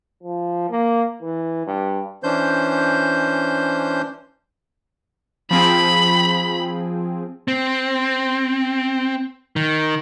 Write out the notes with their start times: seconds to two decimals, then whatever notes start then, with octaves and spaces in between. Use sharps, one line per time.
0.23 F3
0.71 A#3
1.22 E3
1.67 G2
2.23 E3 C#4 D4 C5 G6
5.51 F3 C4 G#4 B5
7.48 C4
9.56 D#3